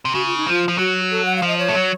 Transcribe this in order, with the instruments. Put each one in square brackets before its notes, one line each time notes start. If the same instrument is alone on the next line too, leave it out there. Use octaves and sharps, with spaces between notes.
[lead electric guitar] C3
[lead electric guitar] C#3 [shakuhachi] F#4
[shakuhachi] F4
D#4
[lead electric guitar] F3 [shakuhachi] F4
[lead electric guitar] F3
[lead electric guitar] F#3 [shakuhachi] F#4
[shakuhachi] A4
F#5
F5
[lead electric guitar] F3
[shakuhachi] D#5
C#5
[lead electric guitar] A3
F#3